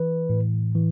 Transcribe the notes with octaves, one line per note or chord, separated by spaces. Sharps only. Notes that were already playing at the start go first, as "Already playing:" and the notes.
Already playing: E3 B4
A2
E3